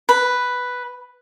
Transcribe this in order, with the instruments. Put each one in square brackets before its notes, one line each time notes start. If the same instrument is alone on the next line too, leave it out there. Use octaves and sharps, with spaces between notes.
[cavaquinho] B4